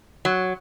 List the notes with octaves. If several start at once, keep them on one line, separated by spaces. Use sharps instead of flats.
F#3